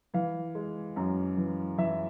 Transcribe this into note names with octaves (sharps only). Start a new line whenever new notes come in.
E3 F5
G#3
F#2
E3
E3 E5